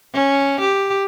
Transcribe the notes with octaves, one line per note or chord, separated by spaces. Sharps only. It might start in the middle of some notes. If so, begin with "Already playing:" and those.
C#4
G4